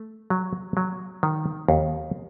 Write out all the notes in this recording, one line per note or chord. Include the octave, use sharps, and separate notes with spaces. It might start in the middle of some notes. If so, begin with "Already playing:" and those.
Already playing: A3
F#3
F#3
D#3
D#2